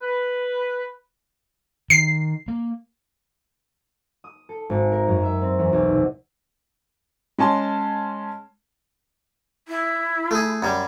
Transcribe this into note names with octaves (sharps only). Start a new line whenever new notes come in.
B4
D#3 C7
A#3
D#6
A4
G#1
A#4
F#2
E5
C4
E2
B1
C3
G#3 C#4 A5 C6
E4
A3 G#4
F#2 G3